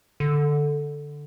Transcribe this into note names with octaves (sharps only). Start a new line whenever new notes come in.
D3